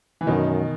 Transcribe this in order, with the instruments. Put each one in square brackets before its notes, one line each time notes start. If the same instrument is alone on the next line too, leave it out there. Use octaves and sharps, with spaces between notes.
[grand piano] E3
[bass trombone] F#2 [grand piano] B2 D#3